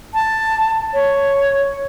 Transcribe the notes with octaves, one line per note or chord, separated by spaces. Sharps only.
A5
C#5